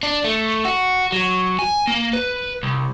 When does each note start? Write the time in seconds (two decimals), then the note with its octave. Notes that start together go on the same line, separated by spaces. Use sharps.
0.03 D4
0.24 A3
0.65 F#4
1.12 F#3
1.59 G#5
1.87 A#3
2.13 B4
2.63 C2